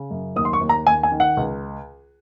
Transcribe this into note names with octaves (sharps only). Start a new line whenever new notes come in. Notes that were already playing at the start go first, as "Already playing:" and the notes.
Already playing: C#3
F#2
D#2 D#6
C6
C#6
D#2
A#5
D#2 G#5
G#5
D#3
F#5
C#2